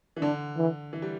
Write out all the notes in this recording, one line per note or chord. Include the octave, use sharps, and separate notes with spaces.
E3
D3 D4
E3
E3
G3